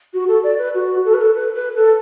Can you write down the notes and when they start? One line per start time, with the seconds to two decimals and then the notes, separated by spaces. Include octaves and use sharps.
0.13 F#4
0.28 A4
0.43 D5
0.58 B4
0.74 F#4
1.04 A4
1.13 B4
1.21 A4
1.34 B4
1.55 B4
1.75 A4